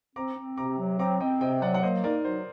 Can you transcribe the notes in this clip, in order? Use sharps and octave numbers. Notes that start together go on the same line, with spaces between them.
C4 A#5 D6
C4
C3 A#5 D6
F#3
C4 A#5 D6
C4 D#5 G5
C3 D#5 G5
F#3 D5 F#5
F#5
A#3 C5 D#5
D#4 A#4 D5
F#3 C5